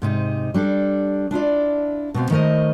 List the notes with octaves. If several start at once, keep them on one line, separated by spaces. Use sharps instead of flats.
G#2 C3 D#4
G3 D4 A4
D4 E4 F4 D5
B2 B3 C4 F5
D#3 A3 A#4 C5 D#5